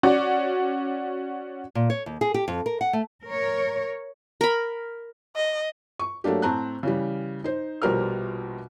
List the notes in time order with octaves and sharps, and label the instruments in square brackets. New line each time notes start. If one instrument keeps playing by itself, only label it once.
[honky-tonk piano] C#4 F#4 D5
[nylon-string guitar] A#2
C#5
D#2
G#4
G4
F2
A#4
F#5
A3
[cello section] A#4 C#5
[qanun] A#4 B5
[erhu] D#5
[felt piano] C#6
F#3 A3 A#3 D4 G4
A2 C4 A5 A#5 F#6
C#3 E3 G3
D#4 C5
A#1 B2 G3 A#4 C5 F6